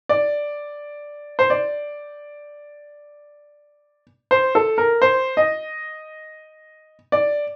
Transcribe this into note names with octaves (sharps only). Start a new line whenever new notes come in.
D5
C5
D5
C5
A4
A#4
C5
D#5
D5